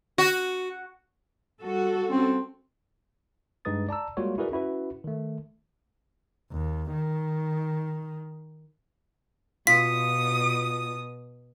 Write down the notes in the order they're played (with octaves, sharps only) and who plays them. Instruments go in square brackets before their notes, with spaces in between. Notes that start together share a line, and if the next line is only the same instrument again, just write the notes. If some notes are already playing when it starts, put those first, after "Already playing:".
[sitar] F#4
[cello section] G3 F#4 A4
[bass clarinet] C4 [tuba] C#4
[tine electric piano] G2 G#3 D#4 B4 D#6 A6
D5 A5 A#5 E6
G3 G#3 A#3 F4 F#4 C#5
E4 F#4 G#4 A#4 B4 D5
C#4 E4 F#4 B4
D#3 A3
[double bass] D#2
D#3
[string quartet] B2 D#6 [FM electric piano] F4 [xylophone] B6